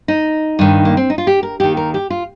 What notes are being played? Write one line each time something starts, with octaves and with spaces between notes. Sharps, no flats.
D#4
G2 D#3
A#3
C4
D#4
F4
G4
A#4
D#2 D#3 G4
A#4
G4
F4